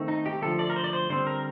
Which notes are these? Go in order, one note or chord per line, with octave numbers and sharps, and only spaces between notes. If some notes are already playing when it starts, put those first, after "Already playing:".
Already playing: D#3 A3 C4
D#4
G4
D3 F3 A3 A4
D5
A#4
C5
D5
C5
D3 G3 C4 C5
A#4